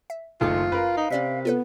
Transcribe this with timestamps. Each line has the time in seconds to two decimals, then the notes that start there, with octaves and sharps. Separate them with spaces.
0.10 E5
0.41 F#1 A#2 D#3 A3 F4 D6
0.72 F#2 A#4 B4 F5
0.97 D#4
1.10 C3 C#4 D5 B6
1.45 B3 F4 A4 B4